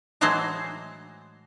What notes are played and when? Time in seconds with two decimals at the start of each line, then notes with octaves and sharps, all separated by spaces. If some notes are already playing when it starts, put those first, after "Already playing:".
0.21 A2 E3 F#3 G#3 C5 A5